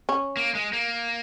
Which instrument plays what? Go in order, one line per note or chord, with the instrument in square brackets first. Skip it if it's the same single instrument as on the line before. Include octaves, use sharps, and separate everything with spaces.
[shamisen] C#4
[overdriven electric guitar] A#3
G#3
A#3